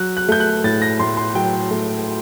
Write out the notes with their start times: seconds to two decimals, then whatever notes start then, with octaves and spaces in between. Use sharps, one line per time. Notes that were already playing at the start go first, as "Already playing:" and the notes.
Already playing: F#3 F#6
0.17 F#6
0.29 A3 G6
0.40 F#6
0.64 A2 A6
0.82 A#6
0.99 A2 C6
1.17 C6
1.35 F#3 G5
1.71 A3